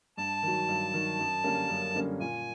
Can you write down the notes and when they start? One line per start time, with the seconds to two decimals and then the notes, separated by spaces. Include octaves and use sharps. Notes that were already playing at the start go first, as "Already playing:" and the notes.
0.17 G2 A5
0.43 D#3 F#3
0.69 G2
0.94 D#3 F#3
1.19 F#2
1.44 D3 G3 A#3 C#4
1.69 F#2
1.94 D3 G3 A#3 C#4
2.20 A#2 G#5